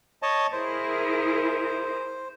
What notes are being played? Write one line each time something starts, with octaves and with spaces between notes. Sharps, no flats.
C#5 D#5 A5
E4 G#4 A#4 C5